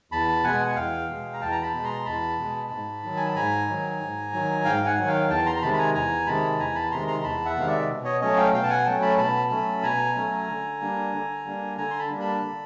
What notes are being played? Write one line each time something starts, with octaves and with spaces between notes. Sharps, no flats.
E2 A5 B5
B2 G#3 F#5 G#5
G#5
E2 F5 G5
B2 G#3
A#5
E2 G5 A5
A#5
A5 B5
B2 G#3
A#5 C6
E2 A5 B5
B2 G#3
G#2
D#3 F#3
G#5
A5
G#2 G#5 A#5
D#3 F#3
G#2
D#3 F#3
G#2 F5 G5
F#5 G#5
D#3 F#3
F5 G5
E2 G5 A5
A#5 C6
A#5
C3 D#3 G#3 A5 B5
B5
G#5 A#5
E2 G#5 A#5
C3 D#3 G#3 A5 B5
E2 G#5 A#5
A5 B5
C3 D#3 G#3 A#5 C6
A#5 C6
E2 A5 B5
E5 F#5
C3 D#3 G#3 F5
D5 E5
B2
C#5 D#5
F#3 A3 C#4 C#5 D#5
F5 G5
B2 F5 G5
A5
F#5 G#5
F#3 A3 C#4 G5 A5
A5 B5
B2 A5 B5
F#3 A3 C#4
B2 G#5 A#5
F#3 A3 C#4
D3
G3 A#3 D4
D3
G3 A#3 D4
D3 G#5 A#5
C6
A5 B5
G3 A#3 D4
A5 B5
D3